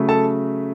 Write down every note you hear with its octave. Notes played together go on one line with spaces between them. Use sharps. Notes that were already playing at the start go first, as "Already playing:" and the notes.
Already playing: C#3 F#3 A3
A4 A5